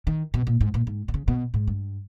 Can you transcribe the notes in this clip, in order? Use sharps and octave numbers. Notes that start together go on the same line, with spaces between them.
D#3
B2
A#2
G#2
A#2
G#2
B2
C#3
B2
G#2
G2